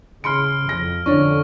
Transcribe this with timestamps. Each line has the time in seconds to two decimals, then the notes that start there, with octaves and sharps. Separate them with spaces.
0.24 C#3 B5 C6 F6 C#7 D7
0.69 F2 A#6
1.06 F2 D3 C#4 D4 C#5 C#6